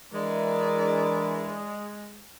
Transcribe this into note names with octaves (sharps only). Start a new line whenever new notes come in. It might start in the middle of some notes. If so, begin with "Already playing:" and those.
E3 G#3 D4 E4 A#4 D5